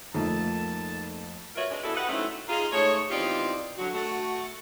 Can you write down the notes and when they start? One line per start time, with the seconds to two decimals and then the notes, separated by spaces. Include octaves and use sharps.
0.15 F2 A3 A#3 D#4 A5
1.56 F4 F#4 A#4 B4 C#5 E5
1.71 G#3 D4
1.83 E3 B3 E4 F#4 A4
1.95 G4 B4 D#5 F#5
2.09 F#3 A3 C4 C#4 D#4 E4
2.48 D#4 F4 G#4
2.72 G#2 A3 G#4 C#5
3.11 E2 C4 D#4 F4 G4 D5
3.78 D3 F#3 F#4
3.94 A3 F#4